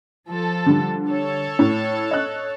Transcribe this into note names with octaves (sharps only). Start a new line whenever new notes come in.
F3 A4
D3 G3
A4 C#5
A2
D#5 F#6